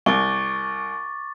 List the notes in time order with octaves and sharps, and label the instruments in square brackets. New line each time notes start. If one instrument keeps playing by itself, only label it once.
[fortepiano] C2 [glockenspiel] C#6 D6 A6